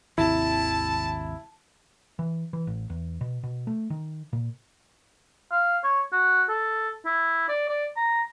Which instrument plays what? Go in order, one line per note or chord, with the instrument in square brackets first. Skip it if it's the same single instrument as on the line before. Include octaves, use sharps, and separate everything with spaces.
[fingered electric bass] G#1 D#2 C3 [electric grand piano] E4 [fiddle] A5
[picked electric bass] E3
E3
A1
E2
B2
B2
A3
D#3
A#2
[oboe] F5
C#5
F#4
A4
E4
D5
D5
A#5